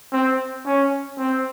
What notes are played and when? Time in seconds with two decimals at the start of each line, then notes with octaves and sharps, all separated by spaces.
0.12 C4
0.66 C#4
1.18 C4